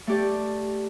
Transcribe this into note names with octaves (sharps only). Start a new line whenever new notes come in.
A3 G4 D5